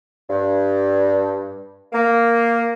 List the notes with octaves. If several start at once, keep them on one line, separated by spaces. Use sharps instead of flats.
G2
A#3